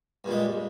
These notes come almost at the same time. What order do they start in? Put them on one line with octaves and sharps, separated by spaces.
G2 A#2 G#3